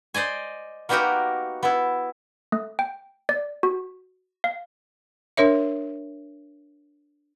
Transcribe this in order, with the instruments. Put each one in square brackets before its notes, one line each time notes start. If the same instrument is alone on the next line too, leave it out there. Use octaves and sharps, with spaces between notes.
[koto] C5 D5 D#5 G#5
A#3 B3 D#4 F#4 G4 A#4
B3 E4
[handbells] A3
G5
D5
F#4
F5
[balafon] D4 A#4 C#5 E5